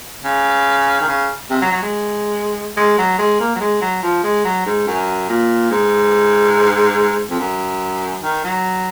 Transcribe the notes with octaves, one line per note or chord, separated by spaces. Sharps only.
C#3
D#3
C#3
C3
F#3
F#3
G#3
G#3
F#3
G#3
A#3
F#3
G#3
F#3
F3
G#3
F#3
G#2
F#2
A#2
G#2
F2
F#2
D#3
F#3